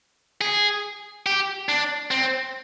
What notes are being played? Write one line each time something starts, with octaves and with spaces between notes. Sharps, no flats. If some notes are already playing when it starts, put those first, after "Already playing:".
G#4
G4
D4
C4